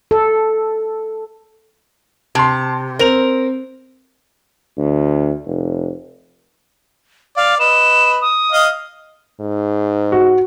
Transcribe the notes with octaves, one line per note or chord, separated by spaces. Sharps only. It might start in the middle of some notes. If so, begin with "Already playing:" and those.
A4
C3 A5 C6
C4 A#4 F7
D2
F1
D5 F5
B4 D#5 E7
D#6
D#5 F5
G#2
F#4